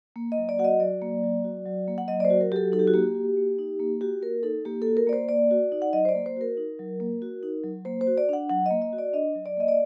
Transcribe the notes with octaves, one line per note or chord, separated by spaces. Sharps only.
A#3
D#5
F#3
D5
F#4 F#5
D#5
F#3 D5
A#3
F#3
F#4
F#3
A#3
F#5
F#3 D#5
D5
C5
F#4
A#4
F#3 G4 A4
D#4 A4
G4
F#4
A#3 G4
F#4
A#3
D#4
A#3
F#4 G4
A#3 A#4
D#4 A4
A#3 G4
A4
F#4
A#4
A#3 D5
C5
A#3 D5
F#4
D#4
F#5
F#3 D#5
C5
D5
A#3
C5
F#4 A#4
D#4
F#3
A#3
F#4
D#4
F#3
A#3 C5
C5
F#4
D5
D4 F#5
F#3 F#5
A#3 D#5
D#5
F#4
D5
D4 D#5
F#3
D5
A#3 D#5
D5